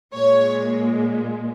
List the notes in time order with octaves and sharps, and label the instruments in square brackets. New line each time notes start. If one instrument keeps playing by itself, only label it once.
[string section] A#2 G#3 C#5